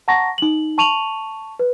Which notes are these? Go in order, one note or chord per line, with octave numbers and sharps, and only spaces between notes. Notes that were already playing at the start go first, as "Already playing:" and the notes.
F#5 A5 A#5 C#6 A#6
D#4 F#7
A5 C#6 D#7 F7 F#7
B4